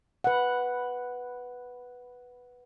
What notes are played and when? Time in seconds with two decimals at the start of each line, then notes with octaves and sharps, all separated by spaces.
0.24 B4 F#5